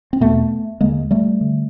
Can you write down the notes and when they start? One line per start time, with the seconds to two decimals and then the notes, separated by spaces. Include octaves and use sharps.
0.13 C4
0.20 E2 B2 A3 B3
0.81 D#2 D3 G#3 A#3
1.11 G3 A3
1.41 D3